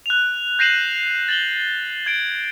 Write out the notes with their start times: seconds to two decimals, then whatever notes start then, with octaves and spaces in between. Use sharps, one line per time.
0.06 F#6 F7
0.59 G6 A#6 C7 D#7 E7 F#7
1.29 A6 F#7 G7
2.06 G#6 D7